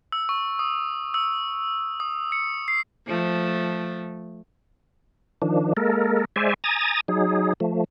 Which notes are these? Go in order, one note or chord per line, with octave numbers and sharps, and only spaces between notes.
E6
C#6
D#6
E6
D#6
C#7
C7
F3 A3
D#3 F3 D4
G#3 A#3 A4 A#4
G#3 C5 D5 E5 G#5
G#5 A#5 D#6 A6
F#3 D#4 G#4
F3 A3